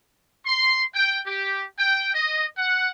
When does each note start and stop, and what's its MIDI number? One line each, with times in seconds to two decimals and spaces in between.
0.46 0.83 84
0.94 1.19 79
1.27 1.64 67
1.79 2.11 79
2.14 2.45 75
2.58 2.91 78